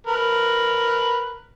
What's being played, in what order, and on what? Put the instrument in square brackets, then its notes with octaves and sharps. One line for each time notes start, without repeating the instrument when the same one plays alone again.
[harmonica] A#4 B4